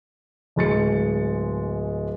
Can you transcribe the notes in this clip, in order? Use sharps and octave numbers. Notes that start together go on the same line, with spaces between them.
D1 G#3 A6 C#7